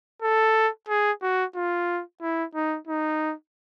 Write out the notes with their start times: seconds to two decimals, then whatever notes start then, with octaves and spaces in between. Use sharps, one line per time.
0.22 A4
0.88 G#4
1.22 F#4
1.55 F4
2.21 E4
2.55 D#4
2.87 D#4